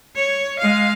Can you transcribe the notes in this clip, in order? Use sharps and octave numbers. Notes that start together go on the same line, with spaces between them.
C#5
G#3 F5